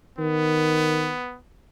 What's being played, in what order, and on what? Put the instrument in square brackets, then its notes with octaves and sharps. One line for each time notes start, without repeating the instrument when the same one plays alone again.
[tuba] D#3 [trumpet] B3